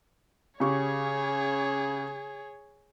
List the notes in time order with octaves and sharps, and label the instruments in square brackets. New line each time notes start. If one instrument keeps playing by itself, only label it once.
[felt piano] C#3 G4 C#6 [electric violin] G#4 C#5